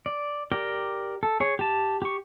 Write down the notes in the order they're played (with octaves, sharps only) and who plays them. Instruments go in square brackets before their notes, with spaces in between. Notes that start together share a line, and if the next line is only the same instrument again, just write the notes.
[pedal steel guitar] D5
G4 A#4 D5 G5
A4
G#4 C#5
G4 A5
G4 C#6